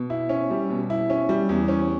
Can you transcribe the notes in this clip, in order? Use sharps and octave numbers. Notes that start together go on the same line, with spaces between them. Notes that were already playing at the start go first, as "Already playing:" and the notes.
Already playing: B2
E4
C#4
G3
B2
E4
C#4
G3
E2
C#4